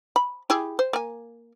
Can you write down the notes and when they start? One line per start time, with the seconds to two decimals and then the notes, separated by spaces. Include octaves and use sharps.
0.16 B5
0.50 E4 G4 G#4
0.79 C5
0.93 A#3 G#5